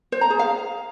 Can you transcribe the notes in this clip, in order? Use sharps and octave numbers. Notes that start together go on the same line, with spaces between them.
C5
A#5
G#4
F5